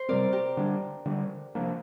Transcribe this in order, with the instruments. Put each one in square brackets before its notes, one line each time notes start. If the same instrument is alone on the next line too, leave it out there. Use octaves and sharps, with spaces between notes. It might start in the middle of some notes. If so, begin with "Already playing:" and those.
Already playing: [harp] C5
[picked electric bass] C3 G3 C4 [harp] A#4 D5
[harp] G4 A#4
[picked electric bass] D3 G3 D4
D3 G3 D4
C3 F3 A#3 D4